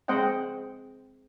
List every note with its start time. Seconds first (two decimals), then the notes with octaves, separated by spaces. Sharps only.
0.08 G#3 C4 C5 D#5 F#5 G5